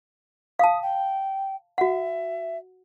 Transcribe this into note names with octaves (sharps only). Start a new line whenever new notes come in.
F5 A5 D#6
G5
F#4 E5 F#5